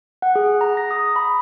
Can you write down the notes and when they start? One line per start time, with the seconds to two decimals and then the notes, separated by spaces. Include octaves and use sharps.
0.22 F#5
0.36 G#4
0.61 A#5
0.77 A#6
0.91 D#6
1.16 B5